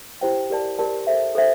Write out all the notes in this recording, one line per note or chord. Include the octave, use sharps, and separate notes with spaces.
E4 G4 C5 G5
G4 A#4 D5 A5
G4 A#4 D5 A5
A4 C5 E5
A4 C5 E5